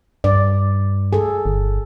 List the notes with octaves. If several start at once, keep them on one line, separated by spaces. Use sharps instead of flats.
G2 D5
G#4 A4
G1